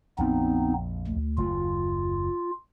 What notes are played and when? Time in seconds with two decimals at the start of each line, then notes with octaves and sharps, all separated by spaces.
0.18 A#1 F2 B3 C4 D#4
1.07 D2
1.38 F#1 D#2 F4